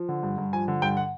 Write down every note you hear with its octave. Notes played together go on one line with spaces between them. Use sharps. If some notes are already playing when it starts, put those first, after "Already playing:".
Already playing: F3
D3
G2
G2
F3 G#5
D3
G2 G5
F#5